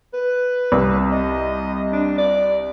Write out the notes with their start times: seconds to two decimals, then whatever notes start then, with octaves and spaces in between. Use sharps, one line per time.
0.14 B4
0.72 C2
1.12 D#5
1.93 D4
2.18 D5